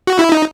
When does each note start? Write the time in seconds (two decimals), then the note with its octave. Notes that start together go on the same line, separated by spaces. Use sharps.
0.07 F#4
0.19 E4
0.32 D#4